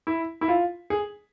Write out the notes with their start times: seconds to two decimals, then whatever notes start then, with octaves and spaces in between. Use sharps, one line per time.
0.07 E4
0.41 E4
0.48 F4
0.90 G#4